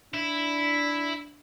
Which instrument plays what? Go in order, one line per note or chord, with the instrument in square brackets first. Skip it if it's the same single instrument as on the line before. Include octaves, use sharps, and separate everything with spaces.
[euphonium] D4 [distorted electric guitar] E4